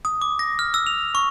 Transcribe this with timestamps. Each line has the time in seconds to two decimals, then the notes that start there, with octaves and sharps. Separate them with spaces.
0.05 D#6
0.22 D6
0.39 A#6
0.59 F6
0.74 E6
0.87 F7
1.15 C#6